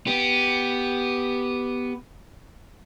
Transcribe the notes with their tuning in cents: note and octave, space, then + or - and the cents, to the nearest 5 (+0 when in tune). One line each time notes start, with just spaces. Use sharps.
B3 +0 G4 +0